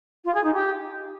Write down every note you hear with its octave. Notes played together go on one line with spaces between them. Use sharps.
F4
G#4
D#4
G4